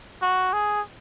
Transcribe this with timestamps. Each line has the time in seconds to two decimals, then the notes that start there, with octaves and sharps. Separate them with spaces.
0.22 F#4
0.53 G#4